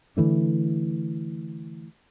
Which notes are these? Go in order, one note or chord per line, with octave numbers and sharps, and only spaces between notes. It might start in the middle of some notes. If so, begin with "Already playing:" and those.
D3 E3 A3 D4